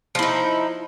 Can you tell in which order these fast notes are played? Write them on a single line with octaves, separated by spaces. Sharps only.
F3 E4 D#4